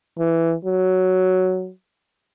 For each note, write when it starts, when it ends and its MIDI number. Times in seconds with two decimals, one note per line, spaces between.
0.18 0.54 52
0.65 1.71 54